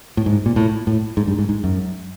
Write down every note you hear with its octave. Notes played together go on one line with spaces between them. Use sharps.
A2
G#2
A#2
A2
A2
G#2
G2
G#2
G#2
F#2